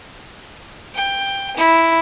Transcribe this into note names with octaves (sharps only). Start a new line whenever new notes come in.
G5
E4